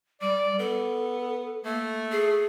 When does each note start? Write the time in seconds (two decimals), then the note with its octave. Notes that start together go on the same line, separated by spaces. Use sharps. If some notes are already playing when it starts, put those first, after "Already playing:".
0.21 G3 D5
0.59 B3 A4
1.65 A3 A#3
2.12 G#4